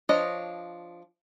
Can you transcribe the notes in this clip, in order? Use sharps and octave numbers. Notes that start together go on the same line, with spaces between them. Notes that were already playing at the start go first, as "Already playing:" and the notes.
F3 D4 C#5 D#5